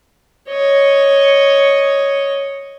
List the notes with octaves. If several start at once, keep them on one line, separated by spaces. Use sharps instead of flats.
C#5 D#5